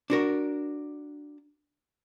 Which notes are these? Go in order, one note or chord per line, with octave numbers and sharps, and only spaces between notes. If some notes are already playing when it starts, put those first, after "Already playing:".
D4 F#4 A#4